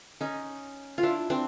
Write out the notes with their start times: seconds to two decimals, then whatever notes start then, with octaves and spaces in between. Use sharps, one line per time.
0.21 C#4 D#4
0.98 F4
1.03 D4 E4
1.30 C4 D4